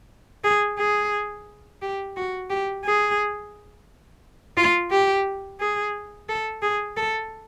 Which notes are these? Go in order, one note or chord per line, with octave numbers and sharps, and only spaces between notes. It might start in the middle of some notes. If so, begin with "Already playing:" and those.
G#4
G#4
G4
F#4
G4
G#4
F4
G4
G#4
A4
G#4
A4